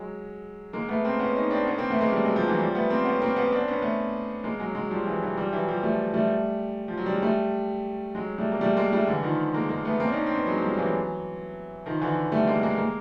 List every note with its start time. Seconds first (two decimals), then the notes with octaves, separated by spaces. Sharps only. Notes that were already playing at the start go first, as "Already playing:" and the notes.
Already playing: F#3 G#3
0.73 G#3 A#3
0.89 A3 B3
1.05 A#3 C4
1.20 B3 C#4
1.35 C#4 D#4
1.50 C4 D4
1.66 B3 C#4
1.77 A#3 C4
1.90 A3 B3
2.01 G#3 A#3
2.12 G3 A3
2.24 F#3 G#3
2.35 F3 G3
2.48 E3 F#3
2.59 F3 G3
2.75 A3 B3
2.90 A#3 C4
3.05 B3 C#4
3.22 A#3 C4
3.36 B3 C#4
3.52 C4 D4
3.68 B3 C#4
3.82 A3 B3
4.44 G#3 A#3
4.59 F#3 G#3
4.75 F#3 G#3
4.91 F3 G3
5.07 E3 F#3
5.22 E3 F#3
5.37 F3 G3
5.52 E3 F#3
5.68 F3 G3
5.83 G3 A3
6.14 G3 A3
6.88 F3
6.97 F#3
7.06 G3
7.14 G#3
7.22 G3 A3
8.15 F#3 G#3
8.38 G3 A3
8.52 A#3
8.61 G3 A3
8.77 G#3 A#3
8.93 G3 A3
9.07 D3 E3
9.23 D#3 F3
9.54 G#3 A#3
9.69 G#3 A#3
9.85 A3 B3
10.00 A#3 C4
10.07 D4
10.12 C#4 D#4
10.26 C4
10.35 B3 C#4
10.46 F#3 G#3
10.57 G#3
10.62 F3 G3
10.77 E3 F#3
11.86 D#3 F3
12.01 D3 E3
12.32 G3 A3
12.47 G#3 A#3
12.63 G#3 A#3
12.78 G#3 A#3